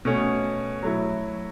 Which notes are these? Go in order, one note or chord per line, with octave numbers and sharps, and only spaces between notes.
B2 A3 C#4
F#3 A3 E4